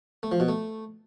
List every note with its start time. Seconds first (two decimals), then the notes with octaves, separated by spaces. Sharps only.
0.23 A3
0.32 F3
0.40 B2
0.48 A3